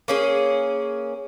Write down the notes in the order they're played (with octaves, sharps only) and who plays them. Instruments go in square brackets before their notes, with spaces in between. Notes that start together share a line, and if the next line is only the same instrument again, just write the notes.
[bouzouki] A#3 C#4 G#4